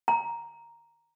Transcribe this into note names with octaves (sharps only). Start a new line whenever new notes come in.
A#5